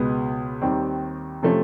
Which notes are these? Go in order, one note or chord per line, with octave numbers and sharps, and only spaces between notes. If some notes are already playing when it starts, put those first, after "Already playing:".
Already playing: C#2 B2 G#3 B3 D#6
D#2 D#3 G3 C4
C3 F3 A3 C#4